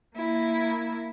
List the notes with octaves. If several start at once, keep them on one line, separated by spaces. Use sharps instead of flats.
A#3 E4